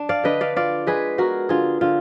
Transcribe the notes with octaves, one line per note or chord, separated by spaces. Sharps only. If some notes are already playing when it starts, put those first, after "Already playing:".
Already playing: D4
D5 F5
D3 B4 D#5
D5 F5
F4 D5 F5
G#3 G#4 B4
B3 F#4 A#4
D3 F4 G#4
D3 F4